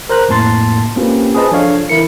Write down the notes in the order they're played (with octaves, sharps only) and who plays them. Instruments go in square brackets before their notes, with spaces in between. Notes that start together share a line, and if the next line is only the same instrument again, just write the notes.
[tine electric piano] A#4 C5 A#5 F#6
F2 A2 A#3 A5 C6 A6
A#3 C4 C#4 F4 G4 B4
G#4 B4 C5 D#5 A5
F3 D4 A4 C#5 F5
E3 E4 A#4 C#7